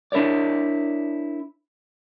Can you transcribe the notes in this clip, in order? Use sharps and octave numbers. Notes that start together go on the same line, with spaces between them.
D4 E4 A#4 C#5 D5